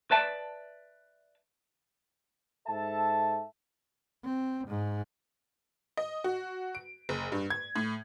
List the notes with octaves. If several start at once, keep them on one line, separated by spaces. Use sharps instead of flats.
B4 D5 E5 A5
G#2 A4 E5 A5
C4
G#2
D#5
F#4
D7
F#1
G2
G#6
A2